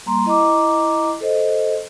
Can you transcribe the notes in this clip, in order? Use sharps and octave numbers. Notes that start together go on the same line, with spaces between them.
G3 A#3 A#5 C6
E4 D#5 A#5 D6
A4 C5 D#5